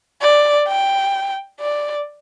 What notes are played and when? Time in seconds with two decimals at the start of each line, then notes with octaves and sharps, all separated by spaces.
0.22 D5
0.68 G5
1.60 D5